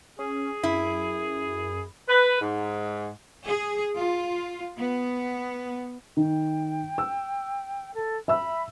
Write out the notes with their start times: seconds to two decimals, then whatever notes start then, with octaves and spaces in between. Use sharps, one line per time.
0.19 C#4 G#4
0.63 F#2 E4
2.09 B4
2.41 G#2
3.47 G#4
3.96 F4
4.77 B3
6.17 D#3 G5
6.98 E6
7.94 A4
8.28 E5 B5 E6